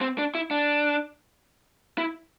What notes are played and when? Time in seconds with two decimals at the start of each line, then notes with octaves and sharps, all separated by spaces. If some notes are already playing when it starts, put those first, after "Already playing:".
0.01 C4
0.18 D4
0.35 E4
0.51 D4
1.98 E4